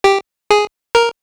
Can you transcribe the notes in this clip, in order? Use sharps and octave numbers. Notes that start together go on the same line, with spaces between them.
G4
G#4
A#4